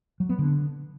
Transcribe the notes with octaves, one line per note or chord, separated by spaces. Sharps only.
F#3
B3
D3